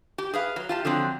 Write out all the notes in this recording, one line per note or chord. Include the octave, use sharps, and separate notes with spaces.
G4
G#4 B4 F5
F#3
F4 G4 A5
D3 F3 F#3 C4